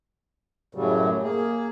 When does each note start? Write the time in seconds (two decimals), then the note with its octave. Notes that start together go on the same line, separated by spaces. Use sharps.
0.75 F#2 A2 C#3 F#3 G3
1.23 A#3 G#4